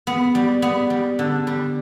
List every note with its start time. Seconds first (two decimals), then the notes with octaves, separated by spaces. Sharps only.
0.07 B3
0.35 G3
0.62 B3
0.90 G3
1.19 D3
1.47 G3